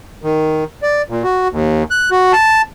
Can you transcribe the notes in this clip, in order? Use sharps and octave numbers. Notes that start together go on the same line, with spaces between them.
D#3
D5
A#2
F#4
D#2
F#6
F#4
A5